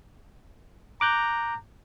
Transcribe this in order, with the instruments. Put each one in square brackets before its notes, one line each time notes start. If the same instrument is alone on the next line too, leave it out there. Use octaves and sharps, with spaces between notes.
[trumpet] A#5 [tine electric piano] D6 F#6 G6